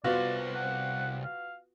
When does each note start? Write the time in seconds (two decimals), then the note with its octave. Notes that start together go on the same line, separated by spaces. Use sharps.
0.04 C2 B3 F4 F#4 C5 D5
0.54 F#5
1.24 F5